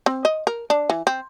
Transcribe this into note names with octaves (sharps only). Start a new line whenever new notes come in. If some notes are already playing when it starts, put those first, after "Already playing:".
C4
D#5
A#4
D4
E3
C4